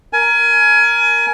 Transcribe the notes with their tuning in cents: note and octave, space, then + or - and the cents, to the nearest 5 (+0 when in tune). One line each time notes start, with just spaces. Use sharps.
A#4 +0 G#5 +25